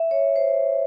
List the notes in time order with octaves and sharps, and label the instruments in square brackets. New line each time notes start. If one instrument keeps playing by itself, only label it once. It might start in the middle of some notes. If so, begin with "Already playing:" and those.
Already playing: [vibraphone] E5
C#5
C5